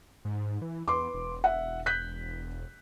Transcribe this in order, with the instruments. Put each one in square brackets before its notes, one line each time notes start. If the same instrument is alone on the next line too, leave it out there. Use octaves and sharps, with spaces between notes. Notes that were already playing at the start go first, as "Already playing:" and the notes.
[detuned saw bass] G#2
E3
[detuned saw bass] E2 [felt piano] B4 C6 D6
[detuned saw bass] E1
[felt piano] E5 F#5
F#6 G6 B6